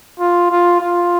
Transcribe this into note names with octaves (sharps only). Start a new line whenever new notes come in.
F4
F4
F4